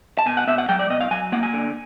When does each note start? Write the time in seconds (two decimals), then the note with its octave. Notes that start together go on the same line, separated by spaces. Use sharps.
0.19 A5
0.26 B2 G#5
0.37 F#5
0.47 B2 E5
0.58 F#5
0.69 F#3 G5
0.79 D5
0.90 B2 D#5
1.01 F5
1.11 F#3 G#5
1.32 A#3 F#5
1.43 G#5
1.53 D3